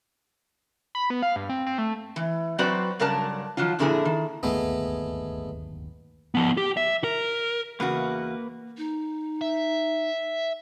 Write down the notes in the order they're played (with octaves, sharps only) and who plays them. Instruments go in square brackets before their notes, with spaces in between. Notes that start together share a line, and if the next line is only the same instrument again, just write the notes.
[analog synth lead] B5
B3
F5
G2
C4
C4
A3
[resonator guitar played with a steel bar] E3
F#3 C4 F#4 B4 C5 D5
G2 C#3 F#3 A#4 D5 A5
D#3 F3 F#3 F4
F2 A#2 D3 E4 G#4 A#4
D#3
[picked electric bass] D1 G1 D#2 [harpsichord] G#3 A3 B3
[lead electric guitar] F3 B3
G4
E5
A#4
[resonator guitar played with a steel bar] E2 C#3 F#4 [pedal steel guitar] A#3 B4
[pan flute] D#4
[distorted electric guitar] E5